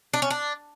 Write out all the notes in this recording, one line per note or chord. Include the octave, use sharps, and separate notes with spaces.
D4
C#4
D4